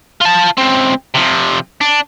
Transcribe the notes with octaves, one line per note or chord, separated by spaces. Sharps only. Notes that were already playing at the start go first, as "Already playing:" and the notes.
F4 A5
C#2 C4
C3 F3
D4